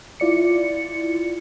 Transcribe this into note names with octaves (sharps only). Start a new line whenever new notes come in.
E4 F4 D5 C#7